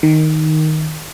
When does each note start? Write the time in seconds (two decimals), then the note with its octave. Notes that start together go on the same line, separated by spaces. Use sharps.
0.03 D#3